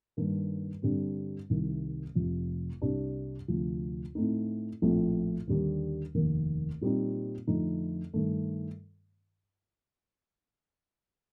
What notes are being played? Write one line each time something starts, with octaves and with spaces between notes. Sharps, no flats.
G2 D#3 A#3
G2 D3 G3 C4
C2 C3 D#3
F1 F2 C3 F3
C2 C3 G3 D4
D2 C3 F3
A2 A3 C4 D#4
A#1 A2 A3 C4 F4
D#2 D3 G3 D4
F1 D#2 D#3 A#3
A#2 G3 C4 D#4
F2 D3 A3 D#4
G2 D#3 A3